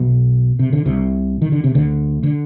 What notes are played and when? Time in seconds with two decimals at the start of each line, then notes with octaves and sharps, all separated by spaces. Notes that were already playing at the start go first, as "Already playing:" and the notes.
Already playing: B1 B2
0.59 C3
0.73 D3
0.86 C2 C3
1.42 D#3
1.52 D3
1.64 C3
1.75 D2 D3
2.23 D3